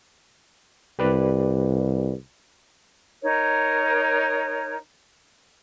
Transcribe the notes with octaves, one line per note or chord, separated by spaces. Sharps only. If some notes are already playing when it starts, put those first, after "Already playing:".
C2 G4 B4 D5
D#4 A#4 C#5